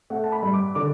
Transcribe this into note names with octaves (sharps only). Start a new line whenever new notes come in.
A3 F#5
A5
B5
G2
D6
D3 D6